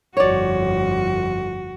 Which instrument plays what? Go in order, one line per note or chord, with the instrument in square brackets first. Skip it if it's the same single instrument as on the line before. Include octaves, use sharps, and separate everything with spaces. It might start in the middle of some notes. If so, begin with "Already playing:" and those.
[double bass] G1 F2 [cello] F#4 [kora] C#5 D5